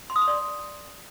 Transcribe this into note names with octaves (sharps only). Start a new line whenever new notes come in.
C6
D#6
C6
D5